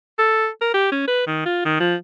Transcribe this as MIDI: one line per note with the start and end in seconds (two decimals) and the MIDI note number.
0.19 0.48 69
0.62 0.70 70
0.74 0.90 67
0.92 1.06 61
1.08 1.24 71
1.27 1.44 51
1.46 1.65 65
1.65 1.77 51
1.80 1.95 53